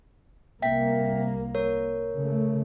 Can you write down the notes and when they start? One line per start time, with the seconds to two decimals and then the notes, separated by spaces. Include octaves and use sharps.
0.62 C2 A#3 E5 G5 B6
1.55 A#4 C#5
2.14 C#3 A3